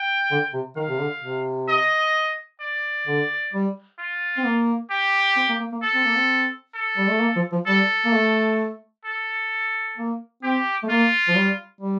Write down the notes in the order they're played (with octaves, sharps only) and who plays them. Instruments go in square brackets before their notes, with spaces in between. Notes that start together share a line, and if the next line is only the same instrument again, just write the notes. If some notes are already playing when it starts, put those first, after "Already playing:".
Already playing: [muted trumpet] G5
[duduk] D3
C3
[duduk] D#3 [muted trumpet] F5
[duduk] C3
D3
C3
[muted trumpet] D#5
D5
[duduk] D3
G3
[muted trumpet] F4
[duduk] C4
A#3
[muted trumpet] G4
[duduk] C4
A#3
A#3
A#3
[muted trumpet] A4
[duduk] C4
A#3
C4
[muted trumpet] A4
[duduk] G3
A3
A#3
F3
F3
[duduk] G3 [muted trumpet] A4
[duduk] A#3
A3
[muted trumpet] A4
[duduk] A#3
[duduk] C4 [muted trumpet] G4
[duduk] A3
[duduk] A#3 [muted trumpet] F4
[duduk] F3
G3
G3